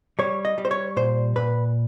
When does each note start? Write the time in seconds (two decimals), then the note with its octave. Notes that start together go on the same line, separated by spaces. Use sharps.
0.19 G3 C#5
0.45 D#5
0.58 G3
0.65 C5
0.71 C#5
0.96 A#2 C5
1.36 A#2 B4